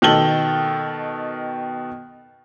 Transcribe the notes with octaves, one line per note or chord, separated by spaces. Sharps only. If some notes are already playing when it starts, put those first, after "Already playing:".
B2 D#3 A4 F#7 G7